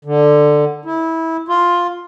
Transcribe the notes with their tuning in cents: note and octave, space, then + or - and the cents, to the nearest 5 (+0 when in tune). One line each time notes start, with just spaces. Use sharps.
D3 +10
E4 -20
F4 +5